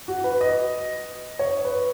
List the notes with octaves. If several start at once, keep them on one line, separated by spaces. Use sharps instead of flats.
F#4
B4
D#5
C#5
B4